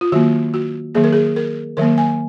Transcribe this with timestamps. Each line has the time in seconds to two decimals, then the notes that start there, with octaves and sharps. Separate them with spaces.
0.01 F4
0.12 D#3 F#3 A#3 F#4
0.54 F#4
0.95 D#3 F#3 A#3 G#4
1.04 A#4
1.13 G#4
1.36 A#4
1.77 D#3 F#3 A#3 A#4
1.98 G#5